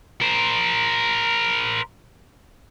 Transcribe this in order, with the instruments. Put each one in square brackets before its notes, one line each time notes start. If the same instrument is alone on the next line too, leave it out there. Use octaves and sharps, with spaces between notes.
[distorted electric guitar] A#4 C5